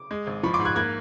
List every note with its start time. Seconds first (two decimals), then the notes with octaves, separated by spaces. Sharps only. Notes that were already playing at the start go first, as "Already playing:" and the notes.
Already playing: D6
0.11 G#3
0.27 G#1
0.43 F3 B5 C#6
0.54 C6 D6
0.60 G#2
0.65 F#6 G#6
0.76 A#3 F#6 G#6